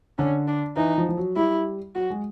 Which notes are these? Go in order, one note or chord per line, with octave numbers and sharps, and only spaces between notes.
D3 C#4
D4
E3 D#4
F3
F3
F#3
G3 E4
F#3 F#4
G#3